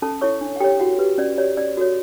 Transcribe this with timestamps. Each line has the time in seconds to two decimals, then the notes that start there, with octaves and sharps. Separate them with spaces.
0.02 C#4 A4 A5
0.21 E4 A4 C#5 C#6
0.41 D4
0.56 F#5
0.60 G4 A4 C#5 G5
0.80 E4 F#4 F#5
0.99 G4 B4
1.18 C#4 D5
1.38 G4 C#5 D5
1.57 C#4 D5
1.77 F#4 A4 C#5